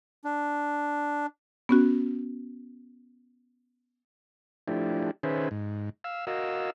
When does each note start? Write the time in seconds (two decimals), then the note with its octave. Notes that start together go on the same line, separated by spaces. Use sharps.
0.24 D4
1.69 B3 C#4 F#4
4.68 F3 A3 D4 E4 G4
5.23 D#3 C#4 G#4 B4 C5 E5
5.51 G#2
6.04 F5 E6
6.27 F#4 A#4 D#5 F5 E6